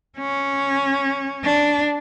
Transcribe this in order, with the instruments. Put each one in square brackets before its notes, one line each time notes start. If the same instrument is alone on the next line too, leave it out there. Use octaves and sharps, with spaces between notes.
[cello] C#4
D4